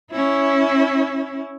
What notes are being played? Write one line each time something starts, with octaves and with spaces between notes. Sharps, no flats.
C#4 E4